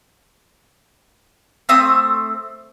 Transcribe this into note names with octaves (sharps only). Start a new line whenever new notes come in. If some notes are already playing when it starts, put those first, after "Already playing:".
A3 C4 D#6